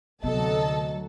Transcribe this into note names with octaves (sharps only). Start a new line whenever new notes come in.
D2 C3 F#3 B3 A4 D#5 A5